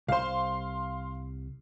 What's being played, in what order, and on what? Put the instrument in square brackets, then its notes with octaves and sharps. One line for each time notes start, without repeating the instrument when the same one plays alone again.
[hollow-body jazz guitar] C2 C5 [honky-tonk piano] F5 C6